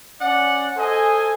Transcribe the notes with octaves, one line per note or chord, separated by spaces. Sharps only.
C#4 D5 F#5
A4 C5 D#5 G#5